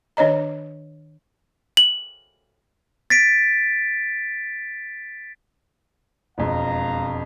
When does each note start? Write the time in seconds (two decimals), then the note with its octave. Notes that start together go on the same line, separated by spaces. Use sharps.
0.17 D#3 D4 C#5 D#5 A#5
1.77 F#7
3.10 A6 B6 D7
6.38 E1 F2 G#3 F5 A#5